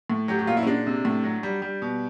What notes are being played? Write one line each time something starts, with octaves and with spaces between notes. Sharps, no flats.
A2
F#3 G4
G4
A#2 F4
E4
C#4
G#3 D4
C3
A2
F#3
G3
G3
B2